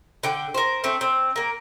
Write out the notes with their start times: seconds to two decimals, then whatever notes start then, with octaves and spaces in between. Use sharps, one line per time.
0.24 D3 G5
0.54 A#4 C5
0.84 A3 C4
1.01 C4
1.36 A#3 A#4